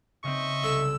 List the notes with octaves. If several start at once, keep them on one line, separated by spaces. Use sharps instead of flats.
C#3 C4 D#5 E5 C#6
C2 A4 E6